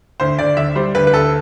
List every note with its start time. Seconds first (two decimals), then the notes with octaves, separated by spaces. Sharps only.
0.20 D2 C5
0.38 D2 D5
0.57 D3 E5
0.75 G3 C5
0.95 D2 B4
1.07 B4
1.13 D2 A4